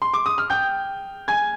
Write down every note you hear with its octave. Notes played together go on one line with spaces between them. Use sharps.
C6
D6
D#6
F6
G5 G6
G#5 G#6